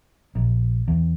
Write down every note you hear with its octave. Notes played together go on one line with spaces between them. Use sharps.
A#1
E2